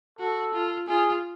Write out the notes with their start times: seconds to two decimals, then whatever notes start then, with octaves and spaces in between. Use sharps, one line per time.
0.19 F#4 A4
0.54 F4
0.88 F4 G#4